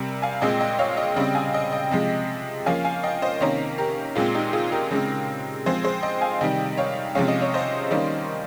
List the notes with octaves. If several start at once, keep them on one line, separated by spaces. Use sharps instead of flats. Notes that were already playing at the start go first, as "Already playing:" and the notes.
Already playing: C3 G3 A#4
F5 G#5
A#2 G#3 C4 D#5 G5
D#5 G5
C#5 F5
D#5 G5
C#3 G3 C4 D#5 G5
F5 G#5
D#5 G5
D#5 G5
C3 F3 G#3
F3 A#3 C#4 F5 G#5
F5 G#5
D#5 G5
C5 D#5
C3 D#3 A#3 C#4 A#4 C#5
G4 A#4
A#2 G#3 C4 F4 G#4
D#4 G4
F4 G#4
G4 A#4
C#3 G#3 C4
F3 G#3 C4 G#4 C5
G#4 C5
D#5 G5
F5 G#5
C3 D#3 G3 D#5 G5
C#5 F5
C3 F3 G#3 C#4 F5
D#5
C#5
C5 D#5
D#3 G3 A#3 C#4